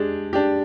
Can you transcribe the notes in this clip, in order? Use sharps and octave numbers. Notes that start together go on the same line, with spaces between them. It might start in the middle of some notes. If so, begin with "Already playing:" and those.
Already playing: G#3 D4 G4
D4 G4